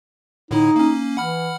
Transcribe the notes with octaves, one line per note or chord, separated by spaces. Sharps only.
A2 D3 D#4 E4
A#3 C#4
E3 F#5 B5 F6